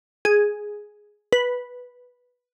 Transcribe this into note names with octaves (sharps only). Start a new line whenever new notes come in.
G#4
B4